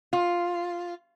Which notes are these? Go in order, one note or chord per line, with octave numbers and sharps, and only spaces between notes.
F4